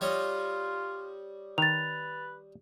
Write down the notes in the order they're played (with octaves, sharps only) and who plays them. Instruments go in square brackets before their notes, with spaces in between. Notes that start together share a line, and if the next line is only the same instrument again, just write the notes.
[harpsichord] G3 C#5 D#5 [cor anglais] F4
[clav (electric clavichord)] D#3 [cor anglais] B4 [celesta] A6 F7